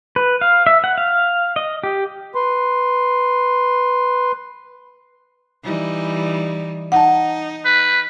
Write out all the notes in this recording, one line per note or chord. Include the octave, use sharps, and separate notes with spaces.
B4
F5
E5
F#5
F5
D#5
G4
B4 C6
E3 G3 D#4
D#4 F#5 A5
B4